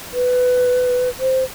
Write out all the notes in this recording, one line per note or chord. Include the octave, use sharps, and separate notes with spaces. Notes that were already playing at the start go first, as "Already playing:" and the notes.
B4
C5